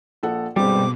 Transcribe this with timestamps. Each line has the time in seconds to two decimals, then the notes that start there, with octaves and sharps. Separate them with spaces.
0.23 A#1 A4 F#5
0.56 G1 B2 G3 G#3 C4 D6